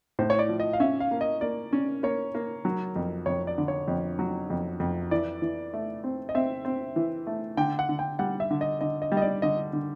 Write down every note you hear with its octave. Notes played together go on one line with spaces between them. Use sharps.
A2 C5
C#5
D5
F3
D#5
F5
C#4 E5
F5
A#3
D#5
A#3 D5
C#4
A#3 C#5
A#3
F#3
F2
F2 C#5
D5
D3
C#5
F2
F#3
F2
F2
E3 D5
E3
A3
C4
D#5
C4 E5
C4
E3
A3
D3 G5
F#5
D3
G5
G3 F#5
E5
D3
D#5
D3 D#5
D#5
G3
D#5
D5
D3 D#5
D3